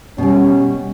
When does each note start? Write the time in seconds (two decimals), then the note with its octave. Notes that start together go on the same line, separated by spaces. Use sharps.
0.18 B2 G3 C#4